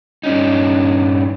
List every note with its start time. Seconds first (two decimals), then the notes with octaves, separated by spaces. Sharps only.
0.23 G2 C#4 D#4